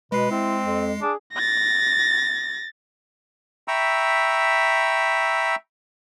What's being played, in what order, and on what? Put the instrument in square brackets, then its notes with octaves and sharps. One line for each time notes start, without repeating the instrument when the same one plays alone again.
[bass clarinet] B2 [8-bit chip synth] G#3 C7 [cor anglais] B4
[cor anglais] C4 [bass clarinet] E4
[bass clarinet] F2
[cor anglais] D4 [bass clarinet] G#4
[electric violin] A6 A#6
[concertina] E5 G5 A#5 B5 C#6 E6